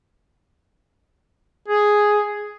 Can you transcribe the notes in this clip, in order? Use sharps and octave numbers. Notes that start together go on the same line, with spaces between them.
G#4